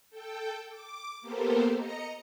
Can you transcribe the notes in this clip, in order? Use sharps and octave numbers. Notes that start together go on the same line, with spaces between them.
A4 G5
D6
A#3 B3 G4 A4 A#4 C5
D#5 A#5 C#7